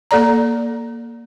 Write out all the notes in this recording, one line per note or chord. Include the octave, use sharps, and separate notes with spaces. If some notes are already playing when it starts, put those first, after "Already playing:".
A#3 A4 D5 A#5